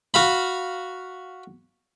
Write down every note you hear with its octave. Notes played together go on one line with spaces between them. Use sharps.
F#4 F5 B5